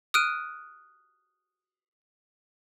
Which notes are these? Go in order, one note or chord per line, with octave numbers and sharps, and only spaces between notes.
D#6 F6 F#6 D7 D#7